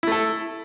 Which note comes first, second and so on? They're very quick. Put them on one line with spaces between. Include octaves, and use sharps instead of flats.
E4 A3 A4